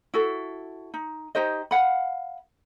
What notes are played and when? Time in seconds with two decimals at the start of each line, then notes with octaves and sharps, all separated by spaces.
0.14 E4 F#4 A4
0.94 D#4
1.35 D#4 G4 C5 D#5
1.71 F5 F#5 B5